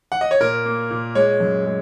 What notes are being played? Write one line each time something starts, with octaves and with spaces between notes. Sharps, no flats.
F#5
D#5
C#5
A#2 A#4
A#3
A#2
G#3 C#5
F#2
G#3